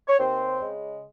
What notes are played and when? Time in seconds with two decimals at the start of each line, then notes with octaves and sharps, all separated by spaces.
0.08 C#5
0.18 D#2 C4 C5
0.61 C#3 G#3